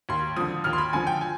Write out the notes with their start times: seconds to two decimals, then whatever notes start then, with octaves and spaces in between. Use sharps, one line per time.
0.09 D#2 C6
0.36 D3 F3 D#6
0.64 D#2 F6
0.73 C6
0.78 B5
0.93 D3 F3 G#5
1.07 G5
1.21 G#5